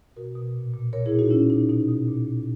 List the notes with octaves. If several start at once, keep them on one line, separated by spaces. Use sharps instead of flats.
B2 F#4 A#4
B2
A#2
A#2
A#2 A#4 C#5
E4 G#4
A#2
D#4 F#4
A#2 C#4 E4
A#2 D#4
B2 D#4
B2
A#2
A#2